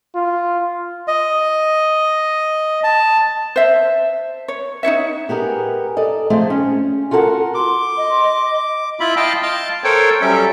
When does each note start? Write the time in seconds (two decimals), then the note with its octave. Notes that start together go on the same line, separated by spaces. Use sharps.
0.15 F4
1.08 D#5
2.84 A5
3.56 C5 E5
4.48 C#5
4.83 D#4 F4 C#5 E5
5.29 B3 G4 G#4 A#4
5.97 A4 D5 D#5
6.30 F3 A3 C4 G#4 A4 C5
6.50 C#4
7.11 F4 F#4 A4 A#4 F#5
7.55 C6 D6
7.97 D#5
9.00 E4 F4 E5 B5
9.17 D#5 F5 G5 A5
9.43 F5 A5 C6
9.84 A4 A#4 C5 C#5 G5
10.22 F#3 G3 C#4 A4 E5